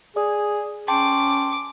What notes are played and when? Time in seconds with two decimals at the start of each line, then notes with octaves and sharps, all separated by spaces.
0.16 G#4 D5 D#6
0.88 C#4 G5 A5 C6 D6